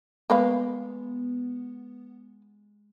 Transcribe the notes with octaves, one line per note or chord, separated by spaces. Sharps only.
G#3 A#3 B3 B4 F5